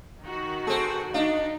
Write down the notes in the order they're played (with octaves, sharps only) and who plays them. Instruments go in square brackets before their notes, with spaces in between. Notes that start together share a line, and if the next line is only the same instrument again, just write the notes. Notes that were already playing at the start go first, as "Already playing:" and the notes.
[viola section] D#3 F#4
[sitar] C4 G#4 [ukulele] A4
[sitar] D4 [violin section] D#4 [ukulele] D#5 F5